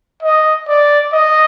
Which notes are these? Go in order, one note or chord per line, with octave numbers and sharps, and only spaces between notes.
D#5
D5
D#5